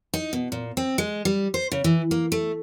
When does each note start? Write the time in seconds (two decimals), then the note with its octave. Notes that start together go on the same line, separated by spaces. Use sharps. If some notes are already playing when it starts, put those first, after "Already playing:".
0.14 D#4
0.33 B2
0.52 A#2
0.77 C4
0.98 G#3
1.25 G3
1.54 C5
1.72 C#3
1.84 E3
2.11 A#3
2.32 A3